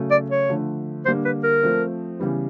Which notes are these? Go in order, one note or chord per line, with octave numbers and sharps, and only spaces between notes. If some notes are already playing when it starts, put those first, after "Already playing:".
Already playing: C#3 F#3 A3
D5
C#5
D3 F3 A3
D3 G3 A#3 D4 C5
B4
A#4
F3 A3 C4
C#3 E3 G3 B3